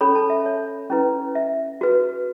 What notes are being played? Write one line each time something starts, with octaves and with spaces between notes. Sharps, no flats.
C#4 A4 C#5 B5
A5
E5
C#5
C#4 E4 B4
E5
F#4 B4